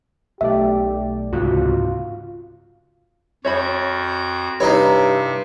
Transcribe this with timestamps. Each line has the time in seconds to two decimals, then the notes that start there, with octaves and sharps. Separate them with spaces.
0.41 B1 A3 G4 D5 E5
1.33 C#2 G#2 C3 F4 F#4
3.45 F2 F#4 C#5 E5 B5 G6
4.60 G2 C3 D#4 E4 C#5 D#5